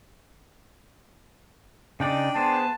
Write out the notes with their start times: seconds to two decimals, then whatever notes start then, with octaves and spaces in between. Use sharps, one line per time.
2.00 C#3 D4 D#4 D5 G5
2.35 B3 G#4 C5 A5